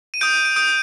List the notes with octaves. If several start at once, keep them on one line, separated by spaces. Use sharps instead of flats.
D#7
D#6 G6 D7
D#7
D7
D#6 G6 D7